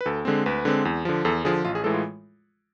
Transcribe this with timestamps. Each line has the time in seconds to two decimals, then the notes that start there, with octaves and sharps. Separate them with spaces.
0.01 B4
0.06 D2 A4
0.25 D3 G#3 C4
0.46 D2 B4
0.65 D3 G#3 C4
0.85 E2
1.05 D3 F3
1.25 E2 A4
1.45 D3 F3 G#4
1.65 A1 F4
1.75 G#4
1.84 A2 E3 G#3 A4
1.94 F4